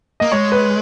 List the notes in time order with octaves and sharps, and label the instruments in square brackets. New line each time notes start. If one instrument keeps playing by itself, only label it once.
[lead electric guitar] A#3 [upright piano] D#5
[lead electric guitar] G#3 [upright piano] C#5
[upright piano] B4